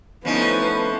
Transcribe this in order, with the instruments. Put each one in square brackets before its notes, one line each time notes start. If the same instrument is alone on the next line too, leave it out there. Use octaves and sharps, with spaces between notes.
[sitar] F3 C#4 D#4 [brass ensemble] A3 E4 B4 [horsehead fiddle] B3